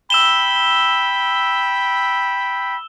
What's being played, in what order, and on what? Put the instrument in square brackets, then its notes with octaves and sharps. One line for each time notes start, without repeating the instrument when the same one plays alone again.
[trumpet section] G5 B5 [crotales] E6 E7 G7